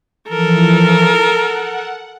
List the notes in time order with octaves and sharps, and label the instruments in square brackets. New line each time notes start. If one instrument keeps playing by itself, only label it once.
[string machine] E3 F3 [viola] A4 A#4
[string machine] F#5